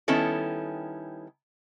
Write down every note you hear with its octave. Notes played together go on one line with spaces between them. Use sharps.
D#3 G3 B3 C#4 E4 A4